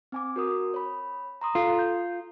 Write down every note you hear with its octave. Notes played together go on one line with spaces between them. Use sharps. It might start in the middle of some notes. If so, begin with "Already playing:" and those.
C4 G#5 D6
F#4 A#4 D#6
C#5 B5
A#5 C6 D#6
F4 A4
G6